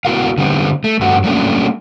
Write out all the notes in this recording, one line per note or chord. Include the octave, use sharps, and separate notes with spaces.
B3 E4 F#4 A#4 F5
D3 G3 B3 C4
A3
G2 A3 C4 F#4
F#3 G3 A3 A#3 C#4 D4